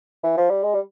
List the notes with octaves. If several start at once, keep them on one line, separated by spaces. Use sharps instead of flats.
E3
F3
G3
G#3
G3